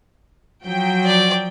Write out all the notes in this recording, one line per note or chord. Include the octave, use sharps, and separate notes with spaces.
F3 F#3 G5
D5